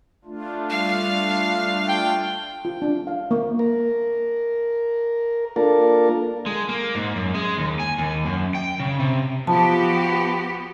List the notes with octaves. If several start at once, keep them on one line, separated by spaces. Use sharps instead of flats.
A3 D4 F4
G3 F5
G5
F4
D4
F5
A#3
A#4
A#3 D4 F4 A4 A#4
G#3
A#3
G#2
F#2
G#3
D#2
G#5
D#2
F#2
G5
C#3
C3
F3 B3 F#4 G4 A5 B5